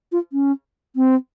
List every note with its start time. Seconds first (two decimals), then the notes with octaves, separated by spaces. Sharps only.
0.12 F4
0.33 C#4
0.96 C4